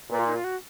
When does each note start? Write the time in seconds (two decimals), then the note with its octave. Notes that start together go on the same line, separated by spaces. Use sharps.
0.10 A#2 B4
0.19 F4
0.26 D#4
0.35 F4
0.44 F#4